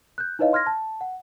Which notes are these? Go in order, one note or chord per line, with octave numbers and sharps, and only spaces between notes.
F#6 G6
D#4 E4 B4 C#5 D#5 F5
C6 F6 G#6 A#6
A5
F#5